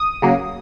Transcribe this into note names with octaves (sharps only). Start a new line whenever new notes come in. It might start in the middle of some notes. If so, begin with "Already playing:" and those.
Already playing: D#6
C#3 F#3 A#3